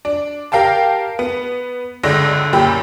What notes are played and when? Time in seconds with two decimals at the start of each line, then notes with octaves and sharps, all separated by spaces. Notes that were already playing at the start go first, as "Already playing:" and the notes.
0.05 D4
0.52 G4 A#4 F5 G5 A5
1.19 B3
2.03 G1 C#2 D3 A#6
2.53 F#2 A#2 G4 G5 B5